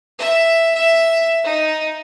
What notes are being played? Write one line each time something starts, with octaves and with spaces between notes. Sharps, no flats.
E5
E5
D#4